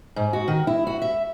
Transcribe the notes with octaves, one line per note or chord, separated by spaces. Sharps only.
G#2
F#4
D#3
E4
F#4
E5